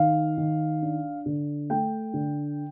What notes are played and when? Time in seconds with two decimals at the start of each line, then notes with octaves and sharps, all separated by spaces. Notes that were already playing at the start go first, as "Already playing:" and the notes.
Already playing: D#3 F5
0.37 D#3
0.82 D4
1.26 D3
1.70 A3 G5
2.14 D3